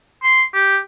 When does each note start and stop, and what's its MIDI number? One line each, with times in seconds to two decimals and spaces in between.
0.23 0.42 84
0.54 0.78 67